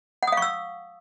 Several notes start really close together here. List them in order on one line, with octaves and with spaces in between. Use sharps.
F#5 D#6 F5 C#6 E6